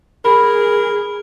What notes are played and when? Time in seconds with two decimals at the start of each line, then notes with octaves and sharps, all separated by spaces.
0.25 G#4 A#4 B5